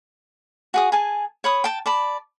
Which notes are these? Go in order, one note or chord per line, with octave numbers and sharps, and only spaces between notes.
F#4 G#4 D#6
G#4 G#5 A5
C#5 B5 D#6
G5 A5
D5 A5 B5